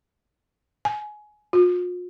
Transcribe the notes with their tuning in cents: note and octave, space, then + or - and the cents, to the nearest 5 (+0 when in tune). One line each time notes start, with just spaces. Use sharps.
G#5 +20
F4 +40